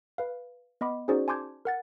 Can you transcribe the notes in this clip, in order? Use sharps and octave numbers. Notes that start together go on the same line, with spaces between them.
B4 F5
B3 D#5 B5 D6
C#4 D#4 F#4 G#4 C5 D5
G#5 A5 C6 D6 G6 G#6
A#4 F#5 A6